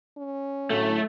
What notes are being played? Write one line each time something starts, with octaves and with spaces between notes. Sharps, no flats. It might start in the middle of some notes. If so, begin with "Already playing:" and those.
C#4
A2 D3 F#3 A3